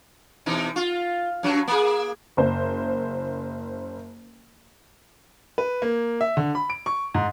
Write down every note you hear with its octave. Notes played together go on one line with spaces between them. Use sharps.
B2 E3 D#4
F4
F#2 F#3
A#3 G#4
F#1 C5
B4
A#3
E5
D3
B5
D7
C#6
G#2